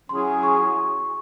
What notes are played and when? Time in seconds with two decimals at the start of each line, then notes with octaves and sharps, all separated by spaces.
0.09 F#3 C#4 E4 G#4 C6
0.43 C#6